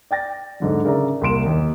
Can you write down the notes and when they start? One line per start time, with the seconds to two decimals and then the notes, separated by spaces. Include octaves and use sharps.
0.11 D5 G5 A6 A#6
0.60 G#2 D3 F#3
0.84 C#3 A#4 D5 E5 A#5
1.21 C2 A#3 C6 D7 E7
1.46 D#2